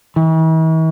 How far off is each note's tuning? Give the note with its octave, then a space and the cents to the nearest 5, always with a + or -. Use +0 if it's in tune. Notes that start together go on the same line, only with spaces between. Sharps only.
E3 -45